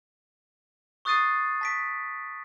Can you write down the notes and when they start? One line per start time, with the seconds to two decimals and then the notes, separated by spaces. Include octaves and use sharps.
1.05 C#6 D#6 F#6 A6 C7 D#7
1.61 A5 B6 D7